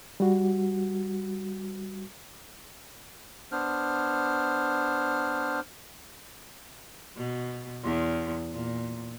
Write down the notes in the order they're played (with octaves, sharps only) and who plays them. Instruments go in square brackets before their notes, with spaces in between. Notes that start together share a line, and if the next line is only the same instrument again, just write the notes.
[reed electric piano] G3 F#4
[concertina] B3 D4 C5 F6
[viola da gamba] B2
E2
A#2